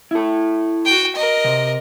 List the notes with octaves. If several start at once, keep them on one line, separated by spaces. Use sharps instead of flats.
E4 A4
F#4 G5
A#4 D#5
C3